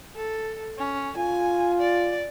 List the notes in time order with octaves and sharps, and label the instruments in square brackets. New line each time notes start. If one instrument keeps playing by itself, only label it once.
[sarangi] A4
C#4
[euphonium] F4 [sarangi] G#5
[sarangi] D5